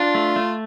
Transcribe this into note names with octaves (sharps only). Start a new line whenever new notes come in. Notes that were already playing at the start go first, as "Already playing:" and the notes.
Already playing: D4 F4
A3
A3